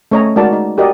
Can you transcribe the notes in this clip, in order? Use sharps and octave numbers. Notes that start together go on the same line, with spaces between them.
A3 C#4 C#5 D#5 A#5
G#3 D#4 F#4 A#4 D5 A5
D#4
F#4 G4 A#4 D5 D#5